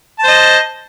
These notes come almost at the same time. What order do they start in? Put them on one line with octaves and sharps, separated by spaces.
A5 C5 D#5